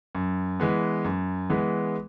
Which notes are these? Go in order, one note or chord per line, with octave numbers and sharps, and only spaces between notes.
F#2
E3 G#3 B3
F#2
E3 G#3 B3